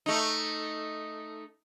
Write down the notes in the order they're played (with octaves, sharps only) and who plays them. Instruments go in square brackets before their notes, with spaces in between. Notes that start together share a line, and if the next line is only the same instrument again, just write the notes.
[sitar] A3 D#4